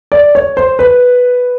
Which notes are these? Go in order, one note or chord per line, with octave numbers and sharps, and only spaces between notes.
D5
C#5
C5
B4